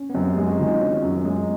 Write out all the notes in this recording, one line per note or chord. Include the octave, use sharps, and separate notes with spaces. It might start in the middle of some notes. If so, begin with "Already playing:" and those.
Already playing: C#4
B3
F#2 C4
G#3 G4
F#4
D#3 F4
C#4
F#2
G#3